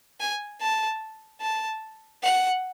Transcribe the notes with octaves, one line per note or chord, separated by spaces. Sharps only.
G#5
A5
A5
F#5